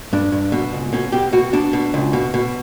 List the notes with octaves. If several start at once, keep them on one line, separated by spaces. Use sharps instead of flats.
G2 D4
G2
B2
C#2
B2 C#4
B2 G4
B2 F#4
B2 D4
B2
C#2
B2
B2